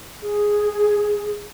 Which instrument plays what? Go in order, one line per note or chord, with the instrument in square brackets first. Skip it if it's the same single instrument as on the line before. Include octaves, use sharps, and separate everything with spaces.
[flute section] G#4